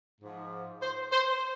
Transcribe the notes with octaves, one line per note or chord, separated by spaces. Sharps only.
G#2 F3
C5
C5